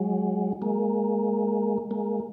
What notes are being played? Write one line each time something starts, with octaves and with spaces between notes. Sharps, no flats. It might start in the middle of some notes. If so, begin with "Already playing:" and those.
Already playing: F#3 G#3
G#3 A#3
G#3 A#3